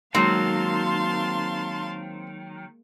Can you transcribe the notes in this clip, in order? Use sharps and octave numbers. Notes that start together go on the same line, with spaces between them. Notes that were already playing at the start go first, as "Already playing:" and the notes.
D#3 F#3 G#3 A#3 C4 F5 A5 C6